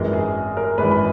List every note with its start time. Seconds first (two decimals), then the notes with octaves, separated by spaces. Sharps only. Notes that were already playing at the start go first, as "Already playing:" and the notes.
Already playing: G#1 F#2 E3 G#3 A#4
0.13 G#4
0.57 A#4
0.78 G#1 F#2 E3 G#3 G#4 B4
0.91 B5